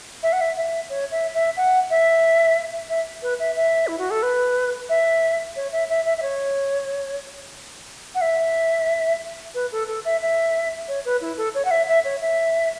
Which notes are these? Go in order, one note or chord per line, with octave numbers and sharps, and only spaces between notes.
E5
F#5
E5
E5
C#5
E5
E5
F#5
E5
E5
B4
E5
E5
E4
F#4
A4
B4
E5
C#5
E5
E5
E5
E5
C#5
F#5
E5
B4
A4
A4
E5
E5
C#5
B4
E4
A4
C#5
F#5
E5
E5
C#5
E5